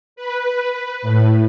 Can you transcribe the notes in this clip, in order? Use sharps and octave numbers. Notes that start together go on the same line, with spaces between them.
B4
A2